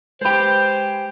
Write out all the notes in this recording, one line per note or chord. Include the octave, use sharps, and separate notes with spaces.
G#3 G4 B4 C5 B5